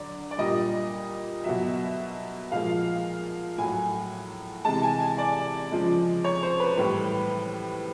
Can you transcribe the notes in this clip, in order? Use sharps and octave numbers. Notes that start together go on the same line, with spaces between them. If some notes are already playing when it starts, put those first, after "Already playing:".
Already playing: D3 F#3 D5
D5
A#2 G3 D#5
B2 F#3 E5
A#2 F3 G#3 F5
A2 F#3 G#5
C3 E3 G#3 A5
G#5
G#5
D5
C#3 F3 G#3
C#5
C5
B4
A2 E3 G3 B4